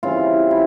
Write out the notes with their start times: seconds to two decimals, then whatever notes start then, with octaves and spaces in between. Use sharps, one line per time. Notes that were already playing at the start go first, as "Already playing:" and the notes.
0.03 C#3 E3 G3 C4 F4
0.51 E4